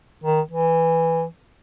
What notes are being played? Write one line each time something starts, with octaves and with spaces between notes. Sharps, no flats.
D#3
E3